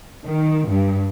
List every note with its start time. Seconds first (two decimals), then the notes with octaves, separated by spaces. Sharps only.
0.25 D#3
0.67 G2